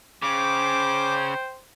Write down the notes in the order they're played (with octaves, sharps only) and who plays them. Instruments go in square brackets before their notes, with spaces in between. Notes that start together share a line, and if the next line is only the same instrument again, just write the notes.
[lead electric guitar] C#3 [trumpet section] C5 G5 [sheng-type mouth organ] D6